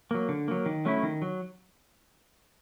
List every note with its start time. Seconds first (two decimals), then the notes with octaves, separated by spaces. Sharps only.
0.11 F#3 A#3
0.29 D3
0.48 F#3 A#3
0.66 D#3
0.85 F#3 A3 C#4 E4
1.03 D#3
1.22 F#3